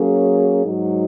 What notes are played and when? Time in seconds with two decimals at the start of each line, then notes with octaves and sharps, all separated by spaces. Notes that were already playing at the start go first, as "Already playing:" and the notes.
Already playing: F#3 A#3 C#4 G#4
0.64 G#2 F#3 D#4 F#4